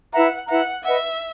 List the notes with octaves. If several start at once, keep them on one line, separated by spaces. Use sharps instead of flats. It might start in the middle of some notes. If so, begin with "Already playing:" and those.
E4 B4 E5 F#5 A#5
E4 B4 E5 F#5 A#5
B4 D#5 E5 F#5